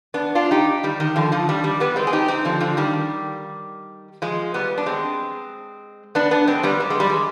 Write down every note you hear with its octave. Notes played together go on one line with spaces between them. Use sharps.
B3 D4
D4 F4
D#4 G4
D#3 G3
D#3
D3 F3
D3 F3
D#3 G3
D#3 G3
G3 B3
G#3 C4
G#4
D#4 G4
C4 D#4
D3 F3
D3 F3
D#3 G3
F3 G#3
G3 B3
D4
G#3 C4
B3 D4
B3 D4
G#3 C4
G3 B3
G3
G#3
G3
G#3